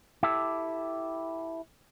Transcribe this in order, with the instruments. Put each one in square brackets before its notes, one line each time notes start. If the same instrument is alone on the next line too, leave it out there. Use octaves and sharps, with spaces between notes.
[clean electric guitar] E4 G4 A4